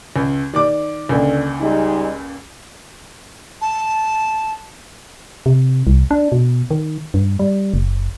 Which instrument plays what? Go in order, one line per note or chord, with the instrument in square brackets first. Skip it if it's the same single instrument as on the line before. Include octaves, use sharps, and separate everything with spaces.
[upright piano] C#2
D#3 D5 D6
[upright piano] C#2 A#2 [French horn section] D3
[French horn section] G3 G#3 D#4
[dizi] A5
[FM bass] C3
C2
D4
B2
D#3
G2
G3
F#1